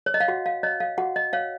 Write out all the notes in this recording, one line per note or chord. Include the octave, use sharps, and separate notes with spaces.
C#5
D#5
F5
F#4 F#5
F5
C#5 D#5
F5
F#4 F#5
D#5
C#5 F5